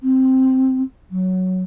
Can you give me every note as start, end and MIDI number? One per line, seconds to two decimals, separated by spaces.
0.01 0.81 60
1.11 1.62 54